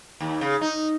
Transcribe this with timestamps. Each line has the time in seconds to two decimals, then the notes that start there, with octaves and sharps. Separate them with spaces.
0.20 D#2
0.41 C#3
0.61 D#4